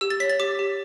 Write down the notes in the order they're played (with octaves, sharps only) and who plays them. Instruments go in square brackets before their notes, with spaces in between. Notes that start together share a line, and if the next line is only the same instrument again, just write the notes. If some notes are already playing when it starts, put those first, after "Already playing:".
[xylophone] G4 E6
A6
C#5 B6
A6
G4 D6
G4